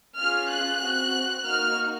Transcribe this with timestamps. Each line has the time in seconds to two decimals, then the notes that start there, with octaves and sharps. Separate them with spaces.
0.19 C#4 F4 G#4 F6
0.51 F#6
0.82 C4 F#4
1.45 A#3 D#4 F#4 F6